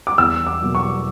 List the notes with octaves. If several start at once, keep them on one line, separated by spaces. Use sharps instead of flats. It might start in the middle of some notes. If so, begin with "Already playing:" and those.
D6
E2 E6
D6
B2 F#3 A#3
C#6